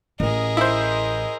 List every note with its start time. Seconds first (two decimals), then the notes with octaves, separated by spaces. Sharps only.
0.20 A1 G#4 A#4 D#5
0.57 E4 C5